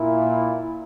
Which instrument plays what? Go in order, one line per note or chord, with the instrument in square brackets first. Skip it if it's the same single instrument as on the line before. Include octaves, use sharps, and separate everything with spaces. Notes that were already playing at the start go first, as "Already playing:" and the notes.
Already playing: [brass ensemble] A#2 A#3 E4